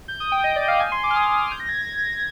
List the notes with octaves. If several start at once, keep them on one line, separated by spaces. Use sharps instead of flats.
G6
D#6
G5
D#5
D5
F5
G#5
C6
D6
F6
D#6
G6
A#6
G#6
A#6
G#6
A#6
G#6